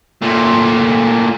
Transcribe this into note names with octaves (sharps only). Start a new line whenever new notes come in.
A#2 A3